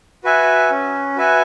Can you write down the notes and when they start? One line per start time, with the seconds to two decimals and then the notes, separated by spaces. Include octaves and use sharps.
0.24 F#4 B4 E5 G#5
0.70 C#4
1.16 F#4 B4 E5 G#5